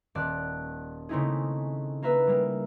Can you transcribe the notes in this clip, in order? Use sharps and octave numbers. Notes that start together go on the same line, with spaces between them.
D#1 D5 A5 F#6
C#3 A3 C4 D#4 E4 G#4
A#3 A#4 B4 E5
G3 G#3 A#3